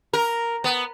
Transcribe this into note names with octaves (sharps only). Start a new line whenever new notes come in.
A#4
B3